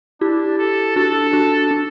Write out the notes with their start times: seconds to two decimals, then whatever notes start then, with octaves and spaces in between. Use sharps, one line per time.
0.21 D4 E4 G4
0.59 A4
0.96 D4 F#4 A4
1.33 D4 F#4
1.71 D4